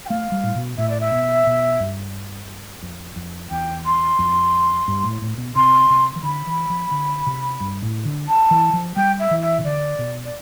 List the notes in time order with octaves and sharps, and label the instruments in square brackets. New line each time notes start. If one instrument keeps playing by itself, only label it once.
[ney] G5
[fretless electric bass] A3 [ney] F5
[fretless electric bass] G3
A2
B2
[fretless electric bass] A2 [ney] E5
[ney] D5
E5
[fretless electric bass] B2
B2
G2
F2
F2
[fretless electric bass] E2 [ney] G5
[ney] C6
[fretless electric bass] F2
G2
A2
A2
B2
[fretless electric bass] C3 [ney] C6
[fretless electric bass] C3
E3
[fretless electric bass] D3 [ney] B5
[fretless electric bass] E3
F3
D3
C3
G2
A2
D3
[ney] A5
[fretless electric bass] E3
F3
[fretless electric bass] G3 [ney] G5
[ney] E5
[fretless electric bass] E3
[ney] E5
[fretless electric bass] C3
[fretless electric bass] D3 [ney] D5
[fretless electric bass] B2
[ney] D5